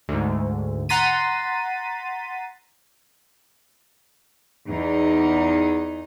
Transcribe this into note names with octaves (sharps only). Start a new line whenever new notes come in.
D2 G#2
F#5 A#5 C6 A6 B6 D#7
E2 D#4